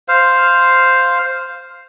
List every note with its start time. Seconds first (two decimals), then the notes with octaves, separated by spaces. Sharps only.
0.08 C5 F5